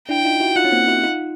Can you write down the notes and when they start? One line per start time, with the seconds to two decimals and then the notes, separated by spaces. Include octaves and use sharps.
0.09 D4 E4 G5
0.25 D#4 F4
0.40 E4 F#4
0.56 D#4 F4 F#5
0.64 C#4
0.72 A#3 C4
0.88 E4 F#4
1.03 D#4 F4